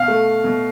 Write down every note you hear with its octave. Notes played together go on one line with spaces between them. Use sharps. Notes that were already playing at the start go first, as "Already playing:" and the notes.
Already playing: B2 F5
A3
B2